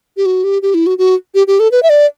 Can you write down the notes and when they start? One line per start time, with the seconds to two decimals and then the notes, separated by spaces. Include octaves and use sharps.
0.17 G4
0.26 F#4
0.44 G4
0.62 G4
0.74 E4
0.86 F#4
0.98 F#4
1.35 G4
1.47 G4
1.60 A4
1.72 B4
1.83 E5
1.90 D5